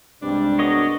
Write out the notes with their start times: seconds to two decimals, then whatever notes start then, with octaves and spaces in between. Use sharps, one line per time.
0.22 C2 G2 G3 G#3 C4 D4
0.59 B3 F#4 G#4 A#4 C#5 D#5